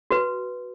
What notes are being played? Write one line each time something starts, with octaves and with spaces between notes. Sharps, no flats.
F#4 B4